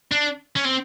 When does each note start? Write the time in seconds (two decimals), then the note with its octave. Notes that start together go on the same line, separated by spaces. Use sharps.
0.11 D4
0.56 C#4
0.65 C4